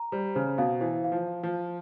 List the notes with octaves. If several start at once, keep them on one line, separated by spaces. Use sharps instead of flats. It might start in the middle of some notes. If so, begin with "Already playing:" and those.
Already playing: A#5
G3 C5
C#3 C5
B2 F5
E3 C5
F5
F3
F5
F3
F5